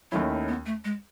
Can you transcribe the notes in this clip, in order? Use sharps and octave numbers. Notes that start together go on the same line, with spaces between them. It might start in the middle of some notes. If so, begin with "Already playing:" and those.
D#2 D#3 F#3 A3 C#4 E4
B3
A3
G#3